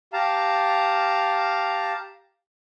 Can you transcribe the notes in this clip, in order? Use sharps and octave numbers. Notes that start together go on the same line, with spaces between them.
G4 F5 A5 A#5